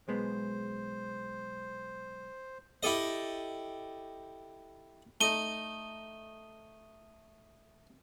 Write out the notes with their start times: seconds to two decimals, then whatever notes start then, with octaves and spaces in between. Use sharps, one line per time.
0.08 B1 G#3 B3 C5
2.83 E4 G4 A4 D#5
5.21 A3 D#4 D#7 G7